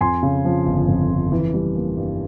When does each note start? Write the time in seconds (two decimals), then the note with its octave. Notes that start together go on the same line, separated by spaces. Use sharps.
0.01 F2 G#5 C6
0.23 C#3
0.45 F3
0.66 G1
0.88 F2
1.10 C#3
1.32 E3
1.54 G3
1.76 A#3
1.97 G2